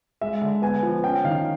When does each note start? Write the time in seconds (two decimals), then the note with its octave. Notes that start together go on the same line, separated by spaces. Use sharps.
0.21 G#3 E5
0.41 D3
0.62 B3 G#5
0.83 F3
1.03 C#4 G5
1.24 D#3 F5